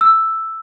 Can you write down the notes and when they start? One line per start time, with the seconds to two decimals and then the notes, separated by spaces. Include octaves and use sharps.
0.01 E6